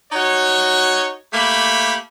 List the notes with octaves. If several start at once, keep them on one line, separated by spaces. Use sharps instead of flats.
D#4 F#4 C#5
A3 A#3 G4 B5